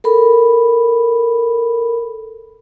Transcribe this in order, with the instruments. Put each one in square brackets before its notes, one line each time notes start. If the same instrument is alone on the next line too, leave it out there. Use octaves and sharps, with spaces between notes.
[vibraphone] A4 A#4 B5